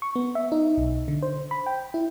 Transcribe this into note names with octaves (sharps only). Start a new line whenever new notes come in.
C#6
B3
E5
D#4
B1
D3
C5
B5
G5
E4